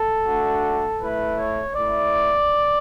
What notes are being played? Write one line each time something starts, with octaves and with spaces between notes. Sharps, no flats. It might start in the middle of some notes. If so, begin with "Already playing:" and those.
Already playing: A4
A3 D4 F#4
A3 E4 B4
C#5
A3 E4 D5